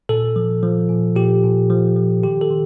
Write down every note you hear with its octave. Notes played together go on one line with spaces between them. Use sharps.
A#2 A4
F3
F3
A#2
A#2 G4
A#2
F3
F3
D#3 G4
A4
D#3